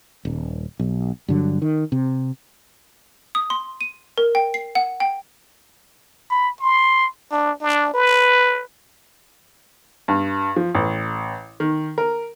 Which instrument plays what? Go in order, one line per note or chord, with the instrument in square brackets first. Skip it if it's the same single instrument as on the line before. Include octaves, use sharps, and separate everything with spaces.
[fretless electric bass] D#1
B1
G2 D3 F#3
D#3
C3
[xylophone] D#6
C6
D#7
A#4
G5
C7
F#5
G5
[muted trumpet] B5
C6
D4
D4
B4
[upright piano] G2
F3
A1
D#3
A#4